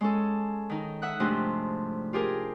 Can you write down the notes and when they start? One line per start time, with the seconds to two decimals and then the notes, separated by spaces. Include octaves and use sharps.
0.01 G#3 C#4 A4
0.70 D#3 D#4
1.02 E5 F#5 D#6 F#6
1.20 G#2 C3 F3 A3 D4 D#4
2.13 F4 G4 G#4 A#4